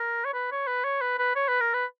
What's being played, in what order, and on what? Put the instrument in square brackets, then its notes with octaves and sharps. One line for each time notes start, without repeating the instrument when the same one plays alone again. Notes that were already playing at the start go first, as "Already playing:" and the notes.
Already playing: [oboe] A#4
C#5
B4
C#5
B4
C#5
B4
B4
C#5
B4
A#4
B4